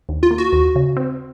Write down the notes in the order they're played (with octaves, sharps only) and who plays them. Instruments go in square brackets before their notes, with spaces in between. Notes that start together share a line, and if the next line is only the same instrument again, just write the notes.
[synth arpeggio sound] D#2
[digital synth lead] F4
[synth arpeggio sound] A#3
[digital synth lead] F#4
[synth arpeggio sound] D#2
C#3
C4